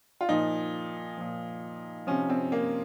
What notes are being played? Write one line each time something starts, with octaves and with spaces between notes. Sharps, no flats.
F4
A#2 F3 D#4
A#2 F3
C3 F3 C#4
C4
A#3